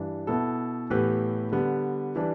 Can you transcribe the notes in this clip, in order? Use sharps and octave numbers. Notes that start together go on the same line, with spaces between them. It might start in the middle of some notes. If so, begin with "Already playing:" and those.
Already playing: G2 E3 G3 D4 B4
B2 B3 E4 A4
A2 E3 B3 G4 B4
D3 G3 B3
E3 G3 D4 B4